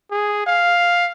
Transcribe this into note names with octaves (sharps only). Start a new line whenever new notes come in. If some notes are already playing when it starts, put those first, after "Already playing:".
G#4
F5